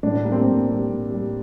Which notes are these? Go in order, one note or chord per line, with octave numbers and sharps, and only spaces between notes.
A2 D4
G3 A#3
C4
A2
C4
G3
A2
G3